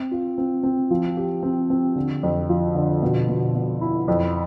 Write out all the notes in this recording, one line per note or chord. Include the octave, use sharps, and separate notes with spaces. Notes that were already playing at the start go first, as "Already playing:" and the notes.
Already playing: C4
F4
C4
C4
F3
G4
C4
C4
D3
F2
F3
D3
B2
B2
B2
E4
F2